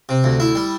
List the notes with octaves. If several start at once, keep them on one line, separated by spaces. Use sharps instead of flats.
C3
D2
E4
G3